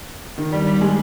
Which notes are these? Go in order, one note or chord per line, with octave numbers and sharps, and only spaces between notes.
D#3
G3
G3
G#3